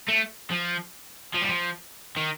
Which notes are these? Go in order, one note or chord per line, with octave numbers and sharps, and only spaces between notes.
A3
F3
F3
G3
F3
D#3